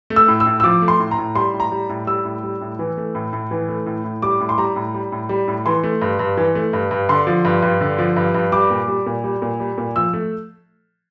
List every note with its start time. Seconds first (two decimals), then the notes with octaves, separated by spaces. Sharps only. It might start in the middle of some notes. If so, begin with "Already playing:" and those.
0.10 A3
0.16 E6
0.28 A2
0.40 E6
0.46 A2
0.60 E6
0.63 F3 D6
0.82 A3
0.88 C6
1.00 A2
1.11 A#5
1.18 A2
1.35 G3 C6
1.53 A2
1.60 A#5
1.72 G3
1.89 A2
2.07 G3 E6
2.25 A2
2.43 G3
2.61 A2
2.79 E3
2.97 A3
3.15 A2
3.33 A2
3.51 E3
3.68 A3
3.86 A2
4.04 A2
4.22 G3 D6
4.40 A2
4.49 C6
4.58 G3 A#5
4.76 A2
4.94 G3
5.12 A2
5.29 G3
5.48 A2
5.66 E3 C6
5.83 A3
6.02 G2
6.19 G2
6.37 E3
6.55 A3
6.73 G2
6.91 G2
7.09 D3 C6
7.27 F3
7.45 G2
7.62 G2
7.81 D3
7.99 F3
8.16 G2
8.34 G2
8.52 G3 D6
8.70 A#2
8.88 G3
9.06 A#2
9.24 G3
9.42 A#2
9.60 G3
9.78 A#2
9.96 F3 E6
10.13 A3